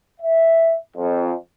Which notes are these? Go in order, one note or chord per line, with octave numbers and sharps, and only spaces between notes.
E5
F2